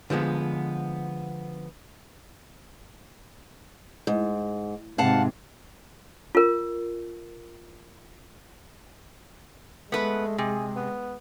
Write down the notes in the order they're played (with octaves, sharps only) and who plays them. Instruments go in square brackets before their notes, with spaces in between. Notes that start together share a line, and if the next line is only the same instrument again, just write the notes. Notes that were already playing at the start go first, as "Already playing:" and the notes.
[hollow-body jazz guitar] D3 F3 G#3 B3
[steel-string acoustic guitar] G#2
[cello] G#2 C3 [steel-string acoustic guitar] F5 F#5 A5
[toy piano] F4 A#4
[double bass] G#3 [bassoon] A3 [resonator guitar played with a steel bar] B3 B4
[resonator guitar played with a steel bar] C3 [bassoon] G#4
[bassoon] B3